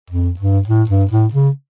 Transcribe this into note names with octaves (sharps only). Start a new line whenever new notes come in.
F2
G2
A2
G2
A2
C#3